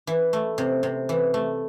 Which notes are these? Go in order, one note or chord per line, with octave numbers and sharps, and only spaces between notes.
E3
A3
C3
C3
E3
A3